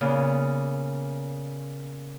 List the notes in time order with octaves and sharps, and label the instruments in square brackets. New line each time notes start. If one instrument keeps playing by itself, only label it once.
[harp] A#2 C#3 B3